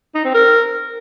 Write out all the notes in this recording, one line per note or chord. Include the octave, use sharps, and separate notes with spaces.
D#4
C4
A#4